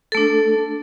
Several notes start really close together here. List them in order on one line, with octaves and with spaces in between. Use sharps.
A4 A3 D4